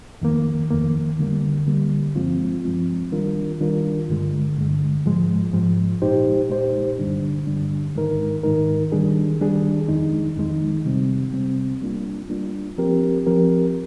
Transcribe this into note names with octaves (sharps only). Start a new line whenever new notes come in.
F2 D#3 A#3
F2 D#3 A#3
D3 G3 A#3
D3 G3 A#3
G2 F3 G#3 C4 F4
G2 F3 G#3 C4 F4
D#3 G3 D4 F4 A#4
D#3 G3 D4 F4 A#4
G2 D3 G#3
G2 D3 G#3
G#2 F3 G#3
G#2 F3 G#3
A#2 G#3 D#4 G4 C5
A#2 G#3 D#4 G4 C5
G2 D3 G3 D4
G2 D3 G3 D4
G#2 D#3 G#3 D#4 A#4
G#2 D#3 G#3 D#4 A#4
D#3 G3 D4 G#4
D#3 G3 D4 G#4
F2 D#3 G#3 D#4
F2 D#3 G#3 D#4
C3 G3 C4
C3 G3 C4
G3 A#3 D4 F4
G3 A#3 D4 F4
F3 C4 G4 A#4
F3 C4 G4 A#4